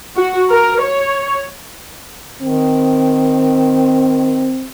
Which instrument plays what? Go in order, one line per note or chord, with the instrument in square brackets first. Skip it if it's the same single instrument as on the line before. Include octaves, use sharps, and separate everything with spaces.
[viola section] F#4
A#4
C#5
[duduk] D#3 [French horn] C4